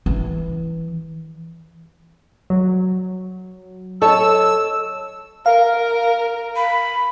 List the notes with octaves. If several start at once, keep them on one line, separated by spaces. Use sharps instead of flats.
E3
F#3
A4 C#5 D#5 A5 E6
A#4 F5
B5